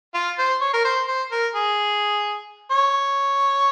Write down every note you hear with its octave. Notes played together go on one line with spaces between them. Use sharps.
F4
C5
C#5
A#4
C5
C5
A#4
G#4
C#5